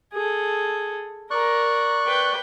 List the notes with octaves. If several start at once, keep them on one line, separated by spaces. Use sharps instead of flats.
G#4 A4
A#4 D5 A#5 C#6 F#6
B4 G5